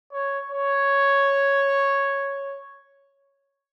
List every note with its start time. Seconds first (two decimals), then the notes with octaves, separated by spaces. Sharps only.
0.13 C#5
0.50 C#5